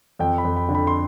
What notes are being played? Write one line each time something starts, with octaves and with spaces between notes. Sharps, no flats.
F2 G5
B5
F2
B5
D3
B5
C6